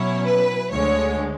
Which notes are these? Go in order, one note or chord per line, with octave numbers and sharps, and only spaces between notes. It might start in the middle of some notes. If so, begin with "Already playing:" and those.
Already playing: B2 F#3 C#4 E4 C#5
B4
D2 D3 G#3 C#5